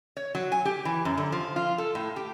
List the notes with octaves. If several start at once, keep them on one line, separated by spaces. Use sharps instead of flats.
C#5
F#3
G#5
G4
E3
F#2
D3
F3
F4
A4
A2
G4